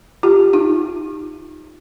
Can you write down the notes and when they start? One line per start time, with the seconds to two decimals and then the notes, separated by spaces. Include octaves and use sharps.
0.23 F4 G4
0.53 D#4 F4